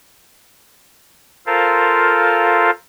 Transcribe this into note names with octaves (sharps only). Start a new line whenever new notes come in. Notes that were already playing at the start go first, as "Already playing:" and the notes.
F4 A4 A#4 C5 F5